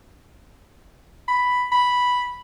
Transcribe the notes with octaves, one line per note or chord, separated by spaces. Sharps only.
B5
B5